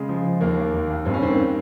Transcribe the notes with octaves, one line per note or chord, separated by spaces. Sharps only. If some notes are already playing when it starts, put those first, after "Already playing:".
Already playing: C#3 G#3
F3
F3
D#2 A#3
D#2
D#2
D#2
G2 C4
C#4
D#3 C4
A#3